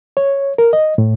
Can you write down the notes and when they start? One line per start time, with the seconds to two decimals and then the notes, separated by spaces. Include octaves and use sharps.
0.17 C#5
0.58 A#4
0.73 D#5
0.98 A2